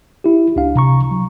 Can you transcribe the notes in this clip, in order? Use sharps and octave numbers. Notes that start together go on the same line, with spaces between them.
E4 G4
C#2 D4 F5
C3 A#5 C#6
F#3